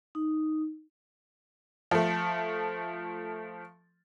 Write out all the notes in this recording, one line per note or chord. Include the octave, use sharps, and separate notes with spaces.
D#4
F3 A3